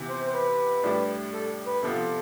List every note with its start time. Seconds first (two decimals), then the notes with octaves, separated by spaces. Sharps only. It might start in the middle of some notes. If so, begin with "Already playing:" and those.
Already playing: C3 E3 B3
0.09 C5
0.27 C5
0.34 B4
0.83 A2 G3 D4
1.34 A4
1.66 B4
1.83 C3 F3 B3 F4 A4